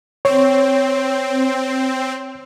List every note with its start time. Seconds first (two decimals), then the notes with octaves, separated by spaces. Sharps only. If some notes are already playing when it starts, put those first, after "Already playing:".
0.25 C4 C#5